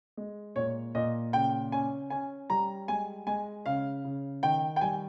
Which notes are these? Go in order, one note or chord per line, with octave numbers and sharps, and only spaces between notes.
G#3
A#2 C#5
A#2 D#5
C#3 G5
C#4 G#5
C#4 G#5
G3 A#5
G#3 G#5
G#3 G#5
C#3 F5
C#3
D#3 G5
G5
G3 G#5